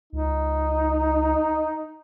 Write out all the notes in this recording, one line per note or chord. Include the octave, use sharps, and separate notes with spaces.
C#2 D#4